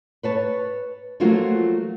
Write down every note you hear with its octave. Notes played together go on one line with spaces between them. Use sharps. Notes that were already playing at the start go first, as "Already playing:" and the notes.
B4 C#5 A5
F3 F#3 A3 A#3 F4 F#4